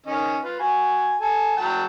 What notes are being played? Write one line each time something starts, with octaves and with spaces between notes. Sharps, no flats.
D#3 C#4 D#5
F4 B4
F#4 G#5
A4 G#5
F#3 G5 A5